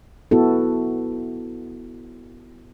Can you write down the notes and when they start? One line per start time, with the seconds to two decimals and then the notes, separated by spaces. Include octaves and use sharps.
0.31 B3 E4 F#4 A4